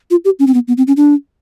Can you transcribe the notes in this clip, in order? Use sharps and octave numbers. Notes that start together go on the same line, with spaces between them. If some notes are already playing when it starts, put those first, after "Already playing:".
F4
G4
C#4
C4
B3
B3
C4
C#4
D4